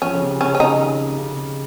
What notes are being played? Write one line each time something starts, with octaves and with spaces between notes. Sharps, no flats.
F3 C#4
C#3
C3
C3 C#4
C#4
C#3 D#4
D#3
C#3